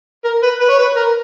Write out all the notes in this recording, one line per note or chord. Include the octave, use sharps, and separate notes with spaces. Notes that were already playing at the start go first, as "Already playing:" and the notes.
A#4
B4
B4
C#5
B4
A#4